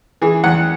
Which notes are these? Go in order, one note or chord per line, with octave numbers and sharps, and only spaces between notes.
E3 G#4
E2 F#5